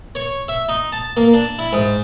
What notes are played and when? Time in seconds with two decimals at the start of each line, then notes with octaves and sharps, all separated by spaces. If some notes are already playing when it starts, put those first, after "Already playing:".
0.15 C#5
0.48 E5
0.69 D#4
0.92 A5
1.17 A#3
1.33 D4
1.59 E4
1.73 G#2